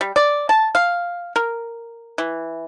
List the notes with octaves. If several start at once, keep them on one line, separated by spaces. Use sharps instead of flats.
G3
D5
A5
F5
A#4
E3